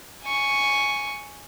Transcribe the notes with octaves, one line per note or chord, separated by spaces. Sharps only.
G#5 C#6